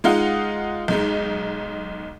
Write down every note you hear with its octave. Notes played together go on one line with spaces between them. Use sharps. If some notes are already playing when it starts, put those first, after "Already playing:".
G#3 D#4 F4 D#5 F5 F#5
B1 G#3 D#4